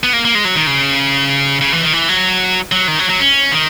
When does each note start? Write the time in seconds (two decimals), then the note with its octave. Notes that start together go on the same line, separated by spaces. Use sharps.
0.03 B3
0.13 A#3
0.25 A#3
0.35 G#3
0.45 F#3
0.56 D#3
0.67 C#3
1.61 C#3
1.72 E3
1.82 D#3
1.93 E3
2.09 F#3
2.72 F#3
2.88 D#3
2.99 F#3
3.09 F#3
3.20 C#4
3.52 D#3